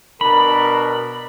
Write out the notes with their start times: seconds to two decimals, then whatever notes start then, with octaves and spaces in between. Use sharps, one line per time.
0.21 B2 D4 A#4 B5